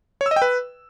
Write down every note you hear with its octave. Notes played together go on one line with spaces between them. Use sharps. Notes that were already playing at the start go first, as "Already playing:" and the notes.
C#5
E6
D#5
G5
B4